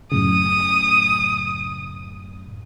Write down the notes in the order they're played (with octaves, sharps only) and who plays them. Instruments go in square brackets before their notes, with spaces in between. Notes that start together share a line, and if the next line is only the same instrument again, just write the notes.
[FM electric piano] F#2 A2 C#3 [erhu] D#6